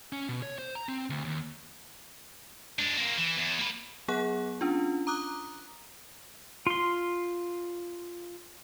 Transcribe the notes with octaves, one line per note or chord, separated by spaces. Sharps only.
C#4
B2
C#5
C5
A#5
C4
D2
D#2
G#3 D4
A#3 C4
E3
E2
A#3 B4
F#3 B3 G#4 F#5 F#6
C#4 D4 F4
A#5 D6 D#6 F#6
F4 C6